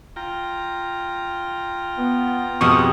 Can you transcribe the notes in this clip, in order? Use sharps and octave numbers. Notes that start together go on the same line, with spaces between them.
F4 G5 A#5
B3
F2 B2 E3 G4 G#4 C#6 D#6 F6